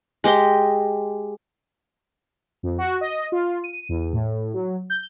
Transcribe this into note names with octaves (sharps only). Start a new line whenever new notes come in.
G#3 G4 D#5 G5
F2
F#4
D#5
F4
D#7
E2
A2
F#3
G6